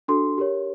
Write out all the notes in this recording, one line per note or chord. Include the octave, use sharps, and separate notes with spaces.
D4 F#4 A4 C6
G4 A#4 C#5